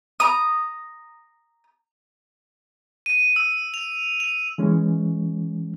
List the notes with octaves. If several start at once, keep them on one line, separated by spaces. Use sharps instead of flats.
A#5 D#6
D#7
E6
F7
F7
E3 G#3 C#4